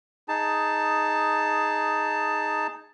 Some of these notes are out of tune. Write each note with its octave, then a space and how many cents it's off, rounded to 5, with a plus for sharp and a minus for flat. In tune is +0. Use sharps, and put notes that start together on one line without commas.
D#4 +0 G#4 +0 A5 +10